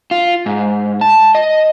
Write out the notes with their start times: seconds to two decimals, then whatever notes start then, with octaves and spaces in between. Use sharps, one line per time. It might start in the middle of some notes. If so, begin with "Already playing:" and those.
0.11 F4
0.46 G#2
1.01 A5
1.35 D#5